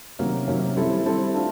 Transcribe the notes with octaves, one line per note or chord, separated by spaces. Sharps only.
C3 D#3 F#3 A#3 C#4
C3 D#3 F#3 A#3 C#4
G3 C4 E4 A4
G3 C4 E4 A4
A3 D4 F4